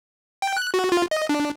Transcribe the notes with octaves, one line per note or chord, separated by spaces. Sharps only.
G5
F#6
F#4
F4
D#5
D4